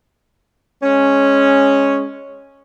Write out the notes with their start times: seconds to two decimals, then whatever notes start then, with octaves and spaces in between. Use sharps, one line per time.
0.83 G#3 C#4